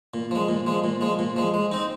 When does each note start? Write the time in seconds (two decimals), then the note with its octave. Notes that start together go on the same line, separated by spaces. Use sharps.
0.14 A#2
0.31 F3 G#3
0.48 A#2
0.67 F3 G#3
0.84 A#2
1.01 F3 G#3
1.19 A#2
1.36 F3 G#3
1.54 G#3
1.72 C4 D#4